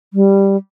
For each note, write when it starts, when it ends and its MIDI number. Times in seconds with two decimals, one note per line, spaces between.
0.14 0.57 55